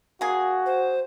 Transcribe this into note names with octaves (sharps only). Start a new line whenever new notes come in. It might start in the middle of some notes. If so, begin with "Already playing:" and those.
A#3 F#4 G#4
C5